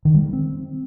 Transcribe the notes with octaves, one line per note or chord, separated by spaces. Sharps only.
D#3
G3
G#3
C4